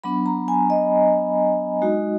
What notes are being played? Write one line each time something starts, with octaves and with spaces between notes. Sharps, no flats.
F#3 B3 D4 B5
A#5
G#5
D#5
G#3 D#4 F#4